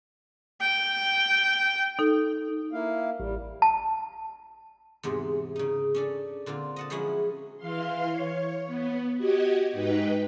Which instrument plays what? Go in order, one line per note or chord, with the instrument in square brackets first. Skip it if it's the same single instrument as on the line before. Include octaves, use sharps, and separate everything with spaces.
[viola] G5
[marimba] D#4 A4
[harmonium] A#3 E4 F5
[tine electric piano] A1 [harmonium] G3
[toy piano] A5
[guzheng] E2 G#2 C3
C#3 D#4
C#4 D4 A4
A#2 D3 C4 F4
D#5 F#5 A5
F3 F#3 G#3 C#4 E4 F#4
[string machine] E3 F5 C6
C#5
B3
F#4 G4 D#5 G#6
G#2 D#4 B4 G5 B6